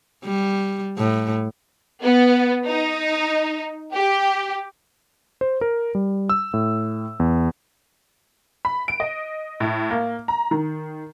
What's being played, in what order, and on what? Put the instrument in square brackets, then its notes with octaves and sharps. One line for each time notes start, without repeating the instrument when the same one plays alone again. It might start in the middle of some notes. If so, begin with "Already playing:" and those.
[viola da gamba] G3
A2
[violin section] B3
D#4
G4
[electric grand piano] C5
A#4
G3
E6
A2
E2
[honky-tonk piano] B5
D7
D#5
A2
A#3
A#5
D#3